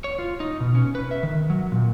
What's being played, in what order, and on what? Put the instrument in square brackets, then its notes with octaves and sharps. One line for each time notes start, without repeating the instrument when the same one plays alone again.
[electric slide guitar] C#5
F4
D#4
B2
C#4
B4
E5
D#3
F#3
A#2